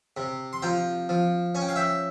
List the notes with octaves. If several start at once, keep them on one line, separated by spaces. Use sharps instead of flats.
C3
C6
F3 G5 A#5
F3
C#4 G#5
G5
F5
E5 G5